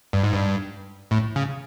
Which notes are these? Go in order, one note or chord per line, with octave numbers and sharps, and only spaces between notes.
G2
G#2
G2
A2
C#3